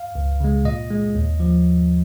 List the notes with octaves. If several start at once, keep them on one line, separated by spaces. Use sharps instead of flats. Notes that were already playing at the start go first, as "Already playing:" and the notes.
Already playing: F5
C#2
C#3 G#3
A#2 D#5
G#3
D#2
F3